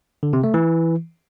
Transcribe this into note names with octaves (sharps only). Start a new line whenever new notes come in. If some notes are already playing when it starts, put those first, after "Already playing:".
D3
C3
A3
E3